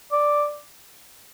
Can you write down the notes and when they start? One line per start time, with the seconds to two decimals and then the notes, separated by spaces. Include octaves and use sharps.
0.12 D5